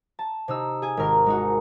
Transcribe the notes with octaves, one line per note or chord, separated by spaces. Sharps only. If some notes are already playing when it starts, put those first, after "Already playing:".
A5
C3 D#4 E6
G#4 G#5
G#1 A#4
G#3 D#4 F#4